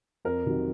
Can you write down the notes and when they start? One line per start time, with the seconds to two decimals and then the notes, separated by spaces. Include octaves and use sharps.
0.25 F2 A#4
0.46 C3 D#3 F#3